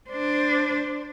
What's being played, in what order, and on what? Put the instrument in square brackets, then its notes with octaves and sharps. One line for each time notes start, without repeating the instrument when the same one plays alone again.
[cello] D4 C5